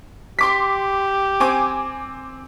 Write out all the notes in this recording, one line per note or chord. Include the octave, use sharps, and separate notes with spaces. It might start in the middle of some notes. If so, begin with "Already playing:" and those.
G4 C6 D6 B6
C4 G#5 D6